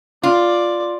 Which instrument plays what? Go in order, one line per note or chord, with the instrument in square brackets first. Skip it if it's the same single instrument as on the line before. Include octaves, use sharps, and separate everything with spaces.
[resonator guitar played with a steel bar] F4 [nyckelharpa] D5